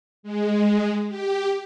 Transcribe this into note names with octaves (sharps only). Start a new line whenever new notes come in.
G#3
G4